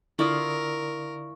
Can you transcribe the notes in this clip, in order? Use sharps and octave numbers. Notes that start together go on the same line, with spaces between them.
D3 E4 F4 A#4 D5 C#6 D#6